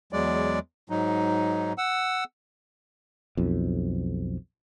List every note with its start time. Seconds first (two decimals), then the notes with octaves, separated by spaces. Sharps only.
0.13 E2 F#3 G#3 D5
0.90 G#2 F#3 D#4
1.78 F#5 E6
3.37 B1 F2